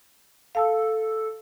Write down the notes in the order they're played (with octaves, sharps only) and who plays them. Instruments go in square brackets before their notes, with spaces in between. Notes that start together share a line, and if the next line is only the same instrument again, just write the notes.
[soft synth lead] A4 [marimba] F5 A5 E6